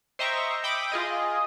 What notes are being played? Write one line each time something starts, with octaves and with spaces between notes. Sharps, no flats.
C5 D#5 E5 G5 A#5 C#6
E5 G5 B5 D6 D#6
F4 G#4 D#5